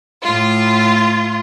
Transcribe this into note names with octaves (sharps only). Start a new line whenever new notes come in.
A2 F4